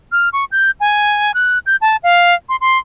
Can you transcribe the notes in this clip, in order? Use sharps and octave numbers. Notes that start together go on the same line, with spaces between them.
F6
C#6
G6
G#5
F#6
G6
A5
F5
C6
C6